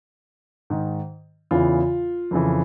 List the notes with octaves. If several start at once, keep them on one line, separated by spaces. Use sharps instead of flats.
G#2 D#3
E2 C#3 E3 F4
F2 C#3 E3